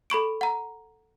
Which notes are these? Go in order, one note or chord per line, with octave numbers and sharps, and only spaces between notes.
A4 B5 C#6 D7
F#5 A#5